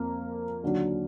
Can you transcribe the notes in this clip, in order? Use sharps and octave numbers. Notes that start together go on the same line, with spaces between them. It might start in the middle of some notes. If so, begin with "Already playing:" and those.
Already playing: F2 F3 A#3
D#2 D3 F#3